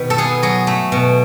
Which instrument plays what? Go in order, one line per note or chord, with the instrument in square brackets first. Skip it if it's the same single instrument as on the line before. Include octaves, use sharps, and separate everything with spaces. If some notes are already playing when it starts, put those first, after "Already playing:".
Already playing: [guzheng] B2 D#3 B4
A4
B3 G#4
F#3 G#4
A3
B2